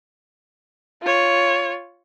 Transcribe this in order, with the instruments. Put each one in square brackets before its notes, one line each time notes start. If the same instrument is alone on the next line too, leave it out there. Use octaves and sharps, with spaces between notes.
[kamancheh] F4 C#5